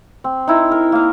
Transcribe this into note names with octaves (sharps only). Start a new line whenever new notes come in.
C4
D#4 E4 A#5 C6
A#4
A#3 F5